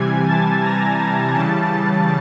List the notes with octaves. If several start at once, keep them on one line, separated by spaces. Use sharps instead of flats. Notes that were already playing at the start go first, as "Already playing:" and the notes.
Already playing: C3 E3 G3 G#5 G#6
A5 A6
A#5 A#6
C#3 E3 G3 A5 A6